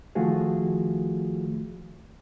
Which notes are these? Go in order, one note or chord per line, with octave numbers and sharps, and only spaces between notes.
D#3 F3 A3 F4 F#4 G#4